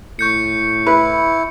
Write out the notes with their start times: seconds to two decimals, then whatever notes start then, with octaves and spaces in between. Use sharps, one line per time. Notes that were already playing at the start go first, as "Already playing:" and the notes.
0.19 A2 C#6 G6 C#7
0.86 E4 B4